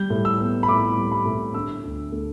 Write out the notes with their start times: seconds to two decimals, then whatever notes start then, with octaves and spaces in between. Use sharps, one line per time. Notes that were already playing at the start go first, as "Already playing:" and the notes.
Already playing: G3 G6
0.10 A2
0.25 E6
0.39 B3
0.63 B5
0.68 A2 D6
0.97 G3
1.12 B5
1.25 A2
1.54 D3 E6
1.84 D2
2.12 A3